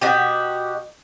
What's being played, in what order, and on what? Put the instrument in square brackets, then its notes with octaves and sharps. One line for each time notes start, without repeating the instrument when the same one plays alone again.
[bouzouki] B2 F#4 G4